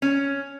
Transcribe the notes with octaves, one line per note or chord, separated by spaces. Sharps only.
C#4